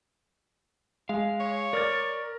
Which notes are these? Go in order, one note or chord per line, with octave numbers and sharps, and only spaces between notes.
G#3 F5
C#5
A#4 D5 F6 A6